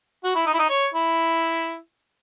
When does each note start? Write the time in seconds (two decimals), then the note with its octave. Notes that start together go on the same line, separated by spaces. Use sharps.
0.24 F#4
0.35 E4
0.46 D#4
0.54 E4
0.59 D#4
0.70 C#5
0.94 E4